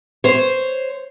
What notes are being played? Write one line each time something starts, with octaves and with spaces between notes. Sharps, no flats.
C5 C#5